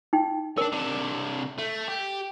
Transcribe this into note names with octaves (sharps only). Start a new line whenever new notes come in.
D#4 G5
C#4 D4 A#4
C3 D4
A3
G4